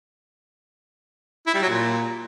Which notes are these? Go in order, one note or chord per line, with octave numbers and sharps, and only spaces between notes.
E4
G3
F#3
A#2